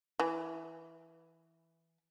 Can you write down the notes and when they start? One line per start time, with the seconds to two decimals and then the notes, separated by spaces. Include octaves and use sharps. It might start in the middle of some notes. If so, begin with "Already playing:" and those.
0.19 E3